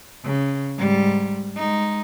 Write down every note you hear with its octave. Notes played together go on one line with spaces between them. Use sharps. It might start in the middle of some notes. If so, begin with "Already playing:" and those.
C#3
G#2 G3
G#3 D#4